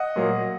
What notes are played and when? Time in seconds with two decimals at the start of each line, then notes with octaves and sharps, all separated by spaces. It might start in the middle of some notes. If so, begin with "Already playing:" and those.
Already playing: D#5 F#5
0.16 A#2 F#3 A#3